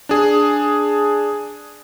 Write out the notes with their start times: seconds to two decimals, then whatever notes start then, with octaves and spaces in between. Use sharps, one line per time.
0.09 D4 G#4